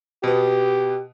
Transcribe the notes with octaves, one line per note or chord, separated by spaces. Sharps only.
B2 B3 G4